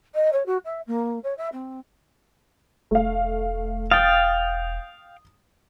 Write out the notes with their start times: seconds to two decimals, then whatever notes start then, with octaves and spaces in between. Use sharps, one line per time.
0.15 D#5
0.33 C#5
0.46 F#4
0.65 E5
0.87 A#3
1.24 C#5
1.38 E5
1.53 C4
2.91 E1 A3 F5
3.91 F5 G5 D#6 A6